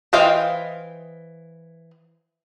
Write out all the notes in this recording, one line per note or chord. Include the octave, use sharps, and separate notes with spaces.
E3 C5 D#5 F5 G5